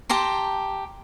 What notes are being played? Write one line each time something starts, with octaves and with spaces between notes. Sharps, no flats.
G4 A5 A#5 C6